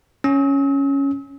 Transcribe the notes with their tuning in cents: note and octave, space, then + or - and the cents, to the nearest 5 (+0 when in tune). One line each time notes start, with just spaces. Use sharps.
C#4 +0 E6 -45